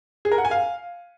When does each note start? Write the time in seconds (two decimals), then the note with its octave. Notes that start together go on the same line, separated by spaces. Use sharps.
0.25 G#4
0.32 A#4
0.38 F#5
0.45 G#5
0.51 F5